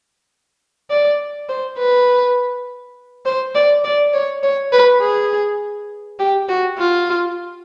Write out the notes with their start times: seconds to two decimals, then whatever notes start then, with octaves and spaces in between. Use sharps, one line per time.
0.90 D5
1.49 C5
1.78 B4
3.26 C5
3.55 D5
3.84 D5
4.14 C#5
4.43 C#5
4.73 B4
5.02 G#4
6.19 G4
6.49 F#4
6.78 F4